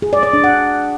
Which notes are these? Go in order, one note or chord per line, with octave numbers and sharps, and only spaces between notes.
G#4
D5
D5
D4
F#5